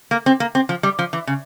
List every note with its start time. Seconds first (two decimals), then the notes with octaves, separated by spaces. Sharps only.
0.11 A#3
0.26 C4
0.40 A#3
0.55 C4
0.69 F3
0.83 G3
0.99 F3
1.13 E3
1.27 C#3